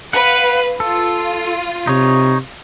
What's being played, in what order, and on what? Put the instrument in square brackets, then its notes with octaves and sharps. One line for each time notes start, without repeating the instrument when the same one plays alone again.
[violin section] B4 F5 [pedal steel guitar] F#5
[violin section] F4 [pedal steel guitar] A4
[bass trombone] C3 [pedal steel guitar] D#4 C#5